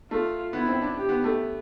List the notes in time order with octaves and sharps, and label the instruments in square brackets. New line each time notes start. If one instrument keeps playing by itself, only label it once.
[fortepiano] A3 [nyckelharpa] F4
[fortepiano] B3 [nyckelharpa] E4
[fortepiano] C4
D4
[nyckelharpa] G4
[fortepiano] B3
A3